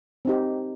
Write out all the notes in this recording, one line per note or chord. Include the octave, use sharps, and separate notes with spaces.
C4 D#4 G4